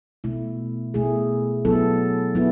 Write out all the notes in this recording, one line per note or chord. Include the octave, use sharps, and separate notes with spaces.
B2 A3 E4
B2 A3 E4 G#4
F#3 B3 E4 A4
F#3 B3 E4